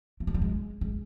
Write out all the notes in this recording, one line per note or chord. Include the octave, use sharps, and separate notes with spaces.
A3
G#3
G3
G#3
G#3